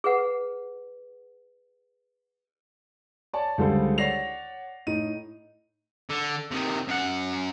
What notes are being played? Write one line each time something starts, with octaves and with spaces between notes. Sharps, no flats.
G#4 B4 F#5
C#5 D5 A5
C#2 D3 G3 G#4 A4 C5
C#5 D5 F#5 A#6 C7 F7
A2 D#4 D#7
D3
C3 D#3
F#2 F#5